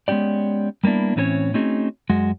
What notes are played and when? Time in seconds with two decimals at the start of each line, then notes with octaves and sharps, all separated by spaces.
0.08 G#3 B3 C#4 G4 D5
0.84 G3 A#3 B3 D4 E4
1.16 A2 E3 C4 C#4 A4 C#5
1.54 A3 C4 C#4 D#4 F#4 G#4
2.10 F#2 G#3 F#4